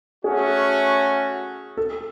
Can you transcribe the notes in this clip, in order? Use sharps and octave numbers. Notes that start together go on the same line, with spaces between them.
A3 C#4 F#4 G#4
A4